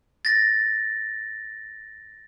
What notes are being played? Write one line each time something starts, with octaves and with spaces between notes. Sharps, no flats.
A6 A#6